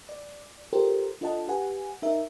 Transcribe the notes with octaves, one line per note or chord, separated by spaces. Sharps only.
D5
F4 G4 A4 A#4 C5 G5
D4 F4 A4 D#5 F#5 A5
G4 B4 F#5 G#5
D#4 A#4 E5